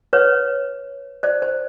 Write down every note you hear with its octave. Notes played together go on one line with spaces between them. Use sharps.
B4 C#5
C5 D5
C5